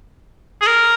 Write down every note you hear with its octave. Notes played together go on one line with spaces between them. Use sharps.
G#4
A#4